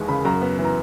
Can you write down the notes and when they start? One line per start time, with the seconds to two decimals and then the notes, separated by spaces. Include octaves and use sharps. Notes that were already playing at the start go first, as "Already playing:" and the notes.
Already playing: D#2 E3 G#3
0.08 C#3 B5
0.25 F#2 A#5
0.41 B3
0.59 E3
0.65 A#5